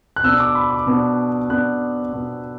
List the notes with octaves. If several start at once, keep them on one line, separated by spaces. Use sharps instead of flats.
F#6
B2 B3 D4 E6
D6
B5
D6
B2 B3 D4
B2 B3 D4 F#6
B2 B3 D4